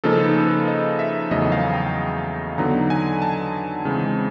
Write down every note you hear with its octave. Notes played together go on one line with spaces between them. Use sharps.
C#3 F3 A#3 D#4 A4
B4
B4
D#5
E5
E2 C#3 F#3 A3 D#5
F5
G5
D3 F#3 B3 D#4 A#5
G#5
A5
C#3 E3 G#3 C4